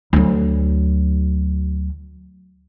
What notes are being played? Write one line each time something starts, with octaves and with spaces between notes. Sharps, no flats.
D2 F#3